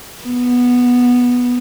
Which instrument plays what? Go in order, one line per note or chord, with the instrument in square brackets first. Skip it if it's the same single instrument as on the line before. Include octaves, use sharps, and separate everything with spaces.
[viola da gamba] B3